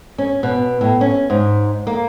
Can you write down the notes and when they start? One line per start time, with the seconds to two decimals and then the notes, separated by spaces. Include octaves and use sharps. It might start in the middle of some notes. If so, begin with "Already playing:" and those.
0.18 C#4
0.43 B2
0.81 A2
1.01 C#4
1.30 G#2
1.87 A#3